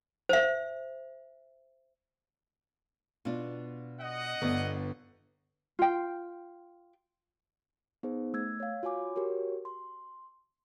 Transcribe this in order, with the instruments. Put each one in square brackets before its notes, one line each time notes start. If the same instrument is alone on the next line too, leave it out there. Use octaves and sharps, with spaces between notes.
[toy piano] C5 E5
[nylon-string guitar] B2 D4 [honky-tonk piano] F4
[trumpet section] D#5 F#5
[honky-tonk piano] G1 D3 D4 [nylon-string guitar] B3
[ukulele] F4 G5
[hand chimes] B3 D#4 G#4 C5
A3 E6 G#6
C#5 F5
F4 F#4 C#5 G#5 D6
F#4 G4 A#4 C#5
C6